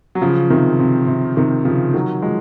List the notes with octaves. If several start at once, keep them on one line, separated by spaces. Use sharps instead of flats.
F#3
C#3 F3
C3 D#3
C3
C3
C3 D#3
C#3 F3
D#3 F#3
F3 G#3